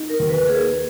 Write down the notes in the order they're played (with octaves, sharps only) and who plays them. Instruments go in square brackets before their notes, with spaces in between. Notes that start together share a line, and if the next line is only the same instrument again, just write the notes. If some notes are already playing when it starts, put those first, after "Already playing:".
Already playing: [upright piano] D#4
[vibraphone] A#4
[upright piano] D#2
[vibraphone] B4
[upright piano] A#3 [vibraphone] G#4